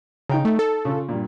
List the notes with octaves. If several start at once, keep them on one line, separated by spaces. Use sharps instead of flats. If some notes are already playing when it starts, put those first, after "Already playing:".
C#3 D#4 G5 A#5
A3
A4
C#3 F4
G2 A#2